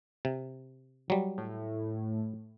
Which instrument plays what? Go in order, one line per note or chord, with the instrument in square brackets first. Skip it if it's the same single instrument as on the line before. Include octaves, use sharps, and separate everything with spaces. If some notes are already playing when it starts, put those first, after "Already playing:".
[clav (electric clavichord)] C3
F#3 G3
[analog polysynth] A2